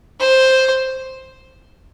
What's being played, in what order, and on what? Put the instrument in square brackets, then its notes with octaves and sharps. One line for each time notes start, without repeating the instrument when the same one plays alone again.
[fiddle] C5